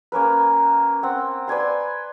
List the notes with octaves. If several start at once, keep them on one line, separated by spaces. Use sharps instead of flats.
A#3 C#4 A#4 B4
C4 F#5
B4 D5 G#5 C6